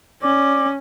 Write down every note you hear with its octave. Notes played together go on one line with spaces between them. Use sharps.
C#4 D5